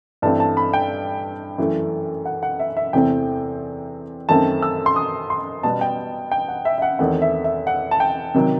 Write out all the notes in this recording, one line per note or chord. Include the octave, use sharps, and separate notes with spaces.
G2 E3 A3 C4 A5
A5
B5
G5
F#2 E3 A3
F#5
F#5
E5
E5
E2 C3 E3 A3 C4 G5
F#2 D#3 A3 C4 A5
E6
C6
D#6
C6
B2 G3 B3 A5
G5
G5
F#5
E5
E5
F#5
E2 D#3 A3 C4 F#5
E5
E5
F#5
A5
G5
C3 D#3 F#3